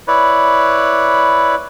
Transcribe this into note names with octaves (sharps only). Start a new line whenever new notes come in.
E4 B4 C#5 D5